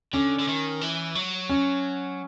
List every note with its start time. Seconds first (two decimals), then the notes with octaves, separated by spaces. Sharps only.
0.13 D3 C#4
0.39 D3
0.48 D#3
0.81 E3
1.15 F#3
1.50 C#4